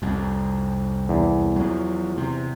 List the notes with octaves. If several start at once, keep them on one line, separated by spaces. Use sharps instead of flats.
C2 F2
E2
F3 F#3
C3